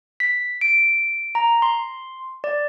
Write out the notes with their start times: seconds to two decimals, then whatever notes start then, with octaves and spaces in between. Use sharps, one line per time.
0.20 B6
0.61 D7
1.35 A#5
1.62 C6
2.44 D5